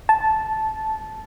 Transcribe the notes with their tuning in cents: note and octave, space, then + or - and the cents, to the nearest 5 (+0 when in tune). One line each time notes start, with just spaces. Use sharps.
A5 -10